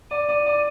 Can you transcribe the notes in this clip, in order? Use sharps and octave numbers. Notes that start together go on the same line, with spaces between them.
D5 D#7
D5
D5